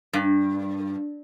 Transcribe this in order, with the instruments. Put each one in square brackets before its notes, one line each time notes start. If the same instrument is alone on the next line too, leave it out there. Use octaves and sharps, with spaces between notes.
[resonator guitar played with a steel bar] G2